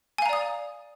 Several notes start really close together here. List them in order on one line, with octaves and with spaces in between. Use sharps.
G#5 F5 A#5 D5 D#6